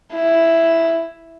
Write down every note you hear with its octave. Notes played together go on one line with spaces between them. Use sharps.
E4